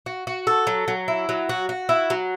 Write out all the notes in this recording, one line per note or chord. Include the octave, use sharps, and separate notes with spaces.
F#4
F#4
A4
F#3
F#3
E4
F#3
F#4
F#4
E4
F#3